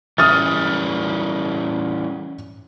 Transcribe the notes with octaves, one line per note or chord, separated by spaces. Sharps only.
E3 G3 C#4 D#6 F6 A6